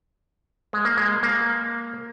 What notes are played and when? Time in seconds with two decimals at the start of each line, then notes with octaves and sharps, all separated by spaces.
0.73 G#3
0.85 A#3
0.97 G#3
1.23 A#3